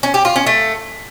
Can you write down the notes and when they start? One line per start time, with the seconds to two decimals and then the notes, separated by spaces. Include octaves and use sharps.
0.03 C#4
0.14 G4
0.25 F4
0.36 C#4
0.46 A3